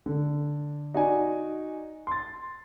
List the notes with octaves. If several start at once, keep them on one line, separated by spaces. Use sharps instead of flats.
D3
D#4 F#4 D5 G#5
C6 A6